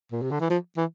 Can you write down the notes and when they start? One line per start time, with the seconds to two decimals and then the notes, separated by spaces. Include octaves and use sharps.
0.12 A#2
0.22 C3
0.31 D3
0.40 E3
0.50 F3
0.77 E3